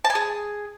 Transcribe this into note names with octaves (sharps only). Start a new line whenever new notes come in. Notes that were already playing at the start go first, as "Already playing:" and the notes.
A5
G#5
G#4